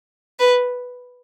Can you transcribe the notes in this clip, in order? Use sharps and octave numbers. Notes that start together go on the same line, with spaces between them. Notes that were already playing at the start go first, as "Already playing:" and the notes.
B4